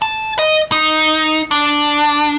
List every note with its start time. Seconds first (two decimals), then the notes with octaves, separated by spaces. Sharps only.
0.02 A5
0.39 D#5
0.72 D#4
1.51 D4